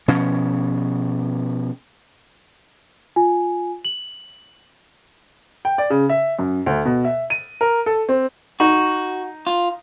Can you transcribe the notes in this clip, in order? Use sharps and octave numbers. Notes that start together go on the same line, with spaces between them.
B2 F3 C#4
F4 G#5
F#7
G5
D5
C#3
E5
F#2
D2
B2
E5
D#7
A#4
A4
C4
D#4 F#4
F4